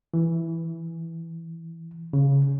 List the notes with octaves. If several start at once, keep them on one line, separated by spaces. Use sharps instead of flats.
E3
C#3